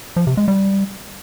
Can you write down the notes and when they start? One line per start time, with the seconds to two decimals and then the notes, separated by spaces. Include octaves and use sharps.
0.16 F3
0.27 C3
0.37 G#3
0.48 G3